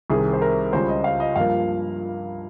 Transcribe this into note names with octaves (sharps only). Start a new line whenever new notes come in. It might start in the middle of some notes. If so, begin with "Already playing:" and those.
C2 C3 D#3 G#4
C5
A#4
C#2 C#3 G3 C5
D#5
F5
D#5
G2 F3 A#3 F5